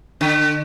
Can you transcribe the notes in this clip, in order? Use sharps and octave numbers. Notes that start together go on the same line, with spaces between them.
D3